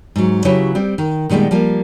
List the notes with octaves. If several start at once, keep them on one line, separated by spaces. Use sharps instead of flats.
G#2 F#3
C#3 F#3 E4 G4 B4 C#5
G3 C4
D#3
A#2 D#3 G3 G#3 B3
F3 G3 A#3